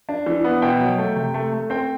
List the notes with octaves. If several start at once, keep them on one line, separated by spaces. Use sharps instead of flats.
D4
E3
B3
B2 G5
F#3
A3
C3
A3
A3
C4 G5